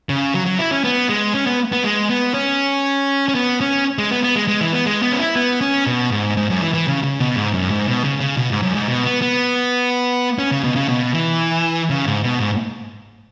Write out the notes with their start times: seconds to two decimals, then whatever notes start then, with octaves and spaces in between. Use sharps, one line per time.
0.09 C#3
0.34 F#3
0.46 F#3
0.59 E4
0.71 C#4
0.84 B3
1.09 G#3
1.34 C#4
1.47 B3
1.72 B3
1.84 G#3
2.10 B3
2.34 C#4
3.29 C#4
3.35 B3
3.61 C#4
3.98 G#3
4.10 B3
4.23 B3
4.36 G#3
4.48 G#3
4.61 E3
4.73 B3
4.86 G#3
5.03 B3
5.12 C#4
5.19 E4
5.36 B3
5.61 C#4
5.87 B2
6.11 G#2
6.37 G#2
6.50 F#2
6.62 E3
6.74 E3
6.87 C#3
7.03 C#3
7.20 B2
7.37 G#2
7.54 F#2
7.71 G#2
7.88 B2
8.04 C#3
8.20 C#3
8.37 B2
8.51 G#2
8.63 F#2
8.75 G#2
8.88 B2
9.04 B3
9.22 B3
10.39 C#4
10.51 C#3
10.64 B2
10.76 C#3
10.89 B2
11.14 E3
11.90 C#3
12.05 G#2
12.23 B2
12.39 G#2